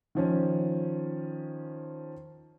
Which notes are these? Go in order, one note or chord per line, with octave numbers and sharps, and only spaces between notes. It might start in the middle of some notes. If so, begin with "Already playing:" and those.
D#3 F3 C#4